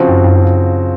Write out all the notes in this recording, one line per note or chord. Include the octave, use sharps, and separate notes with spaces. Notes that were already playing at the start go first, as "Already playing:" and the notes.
Already playing: C#3 F3 C4 F#4
F#2
F#2